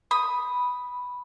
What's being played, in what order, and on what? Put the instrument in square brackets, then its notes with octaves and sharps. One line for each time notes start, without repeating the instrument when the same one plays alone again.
[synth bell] B5 [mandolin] D#6